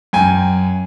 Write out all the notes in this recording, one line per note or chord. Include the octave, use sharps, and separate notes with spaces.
F#2 G5 G#5